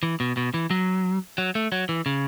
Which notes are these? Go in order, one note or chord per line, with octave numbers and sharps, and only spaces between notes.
E3
B2
B2
E3
F#3
F#3
A3
F#3
E3
C#3